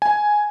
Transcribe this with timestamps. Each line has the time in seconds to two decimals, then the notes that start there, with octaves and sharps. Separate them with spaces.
0.02 G#5